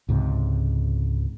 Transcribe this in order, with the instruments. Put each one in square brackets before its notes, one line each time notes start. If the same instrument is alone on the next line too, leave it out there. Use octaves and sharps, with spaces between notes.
[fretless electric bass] C#2 G#2 C3